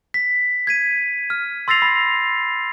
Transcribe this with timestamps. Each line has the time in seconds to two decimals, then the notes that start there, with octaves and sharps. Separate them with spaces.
0.14 B6
0.67 G#6 B6 D#7
1.30 F6
1.68 C6 E6 A6 A#6 C7 F7
1.82 B5